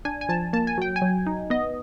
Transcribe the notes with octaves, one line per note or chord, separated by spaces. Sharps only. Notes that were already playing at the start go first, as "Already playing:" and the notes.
D4 G#5
G#5
F3 A5
A#3 A5
G#5
F#3 G5
G#5
F#3
D#4
B3 D#5